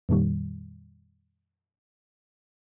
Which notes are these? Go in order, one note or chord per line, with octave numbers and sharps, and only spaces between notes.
F2 A#2 D#3 G3